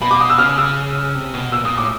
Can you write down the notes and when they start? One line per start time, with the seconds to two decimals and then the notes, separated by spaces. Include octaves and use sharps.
0.02 B2 B5
0.11 D6
0.20 D#6
0.30 E6
0.39 C#3 F6
0.58 E6
1.15 C3
1.34 B2
1.52 A#2 E6
1.65 A#2 D#6
1.77 A2 D6